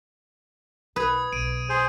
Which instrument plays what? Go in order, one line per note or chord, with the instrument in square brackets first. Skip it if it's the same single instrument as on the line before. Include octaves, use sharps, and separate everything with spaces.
[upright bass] B1 [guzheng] B4 [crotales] D#6 G#6
[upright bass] B1 [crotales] D7 D#7
[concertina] G#4 C5